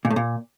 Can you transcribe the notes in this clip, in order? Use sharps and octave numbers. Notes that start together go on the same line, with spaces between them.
A#2
A2
A#2